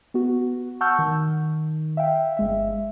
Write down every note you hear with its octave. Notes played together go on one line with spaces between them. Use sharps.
B3 F#4
F#5 A5 C#6 E6 F6 G6
D#3
E5 F5 G5
G1 G#3 E5